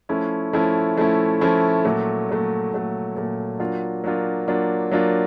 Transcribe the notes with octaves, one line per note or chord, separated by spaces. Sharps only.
F3 A3 C#4 E4
F3 A3 C#4 E4
F3 A3 C#4 E4
F3 A3 C#4 E4
A#2 F#3 A3
A#2 F#3 A3
A#2 F#3 A3
A#2 F#3 A3
F#3 A#3 D4 F4
F#3 A#3 D4 F4
F#3 A#3 D4 F4
F#3 A#3 D4 F4